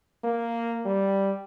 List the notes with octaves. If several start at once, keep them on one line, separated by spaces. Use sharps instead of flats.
A#3
G3